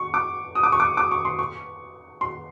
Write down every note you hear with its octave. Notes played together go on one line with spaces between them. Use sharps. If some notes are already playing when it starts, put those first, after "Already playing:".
Already playing: C#6
D6
D#6
D6
C#6
D6
D6
C#6
C6
C#6
C6